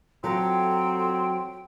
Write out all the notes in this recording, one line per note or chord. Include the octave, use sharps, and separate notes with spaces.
F#3 C4 F4 A4 G5 A#5